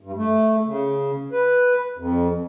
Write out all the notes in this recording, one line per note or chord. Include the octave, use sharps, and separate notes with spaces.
G2
A3
C#3
B4
F2